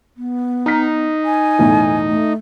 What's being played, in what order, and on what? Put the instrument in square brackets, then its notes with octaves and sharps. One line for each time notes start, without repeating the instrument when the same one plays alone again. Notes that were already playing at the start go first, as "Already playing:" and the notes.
[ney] B3
[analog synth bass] D#4 [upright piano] A#5 F6 B6
[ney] G#5
[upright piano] B1 E2 A2
[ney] A3